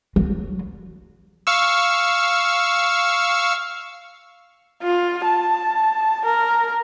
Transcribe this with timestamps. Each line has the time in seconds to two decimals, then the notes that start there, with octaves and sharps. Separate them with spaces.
0.16 F#3
1.47 F5 C#6 E6
4.83 F4
5.25 A5
6.25 A#4